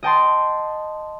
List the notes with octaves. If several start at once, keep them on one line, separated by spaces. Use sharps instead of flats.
D#5 G5 A5 C6